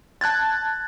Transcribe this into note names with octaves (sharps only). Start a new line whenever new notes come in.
A5 F#6 G#6 A6